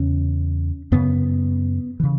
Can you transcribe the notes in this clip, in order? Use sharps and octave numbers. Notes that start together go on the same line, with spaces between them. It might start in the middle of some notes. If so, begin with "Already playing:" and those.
Already playing: E2 C#3 C#4
F#2 C#3 B3
C#3 E3